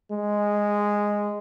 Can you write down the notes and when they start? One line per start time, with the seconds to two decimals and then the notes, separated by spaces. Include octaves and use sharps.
0.11 G#3